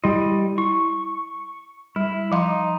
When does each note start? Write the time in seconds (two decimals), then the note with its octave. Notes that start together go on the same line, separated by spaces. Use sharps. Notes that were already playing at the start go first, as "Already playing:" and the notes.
0.04 G3 E4 G4 D#5
0.58 E4 C#6
1.96 G3 E4
2.32 F3 D#4 F5 C6